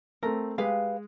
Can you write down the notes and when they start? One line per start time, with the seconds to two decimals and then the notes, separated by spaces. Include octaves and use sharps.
0.23 A3 C4 A#4
0.58 G#3 G4 B4 F5